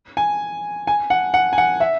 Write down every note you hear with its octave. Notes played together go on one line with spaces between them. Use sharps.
G#5
G#5
F#5
F#5
G#5
F#5
E5